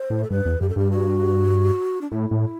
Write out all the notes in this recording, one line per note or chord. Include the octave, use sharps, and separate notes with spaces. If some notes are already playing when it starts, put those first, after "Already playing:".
Already playing: C5
A2
A4
G2 B4
E2
F#2 G4
A4
G2 G4
F#4
D4
A2 E4
A2